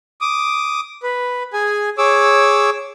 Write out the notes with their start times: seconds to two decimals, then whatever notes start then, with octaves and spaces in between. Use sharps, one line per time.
0.21 D6 D#6
1.03 B4
1.53 G#4 G#5
1.98 G#4 C#5 D6 E6